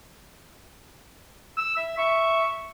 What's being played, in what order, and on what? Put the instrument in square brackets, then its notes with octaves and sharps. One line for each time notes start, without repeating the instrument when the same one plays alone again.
[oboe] E6
E5
[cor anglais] E5 [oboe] C#6